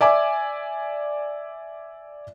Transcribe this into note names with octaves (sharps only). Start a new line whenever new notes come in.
D5 E5 G#5 D6